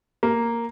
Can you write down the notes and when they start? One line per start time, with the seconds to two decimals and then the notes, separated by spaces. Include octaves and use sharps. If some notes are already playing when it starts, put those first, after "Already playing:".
0.23 A#3